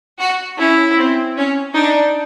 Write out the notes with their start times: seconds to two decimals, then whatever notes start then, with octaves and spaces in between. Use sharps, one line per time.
0.19 F#4
0.58 C#4 E4
0.98 C4
1.36 C#4
1.74 D4 D#4